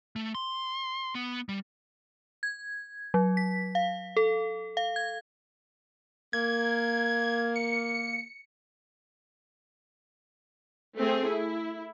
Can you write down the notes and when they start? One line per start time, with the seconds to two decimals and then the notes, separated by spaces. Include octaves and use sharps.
0.16 A3
0.35 C6
1.15 B3
1.49 G3
2.43 G#6
3.14 F#3
3.37 B6
3.75 F5
4.17 A4
4.77 F5
4.96 G#6
6.33 A#3 G#6
7.56 C#7
10.97 A3 C4 G#4
11.28 E4